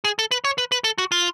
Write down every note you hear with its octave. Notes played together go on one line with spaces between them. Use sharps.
G#4
A4
B4
C#5
B4
B4
A4
F#4
F4